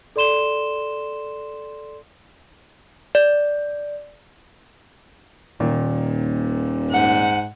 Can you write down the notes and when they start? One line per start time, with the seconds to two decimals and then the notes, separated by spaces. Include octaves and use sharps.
0.16 A4 D5 C6 E7 G7
3.15 D5
5.60 D#1 A#2 D#3
6.91 G#2 F#5